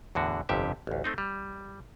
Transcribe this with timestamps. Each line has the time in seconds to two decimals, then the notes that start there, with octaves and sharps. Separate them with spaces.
0.15 E2 A2 D3 F#4
0.49 G1 F2 C3 G4 E5
0.87 A1 D2
1.04 A3 C4 D#4
1.18 G3